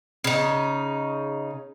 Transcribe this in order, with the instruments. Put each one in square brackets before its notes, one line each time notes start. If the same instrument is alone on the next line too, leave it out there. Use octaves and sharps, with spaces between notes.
[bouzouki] C#3 D#4